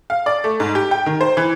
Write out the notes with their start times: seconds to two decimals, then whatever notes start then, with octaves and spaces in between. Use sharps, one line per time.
0.10 F5
0.26 D5
0.44 A3
0.60 G#2
0.75 G4
0.91 G5
1.06 D#3
1.21 C5
1.37 E3